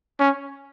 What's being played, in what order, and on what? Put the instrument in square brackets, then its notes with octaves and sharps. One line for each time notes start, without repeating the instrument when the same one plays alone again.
[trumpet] C#4